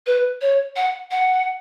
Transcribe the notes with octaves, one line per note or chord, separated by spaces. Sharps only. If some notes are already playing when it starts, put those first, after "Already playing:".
B4
C#5
F#5
F#5